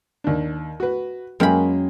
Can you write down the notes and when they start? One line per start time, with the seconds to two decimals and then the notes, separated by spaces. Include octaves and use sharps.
0.24 D#2 D4
0.80 F#4 B4
1.40 F#2 G#3 A#3 G5 B5